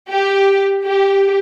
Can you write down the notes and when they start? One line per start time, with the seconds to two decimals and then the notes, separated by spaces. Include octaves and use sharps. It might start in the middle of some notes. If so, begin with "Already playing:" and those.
0.11 G4
0.86 G4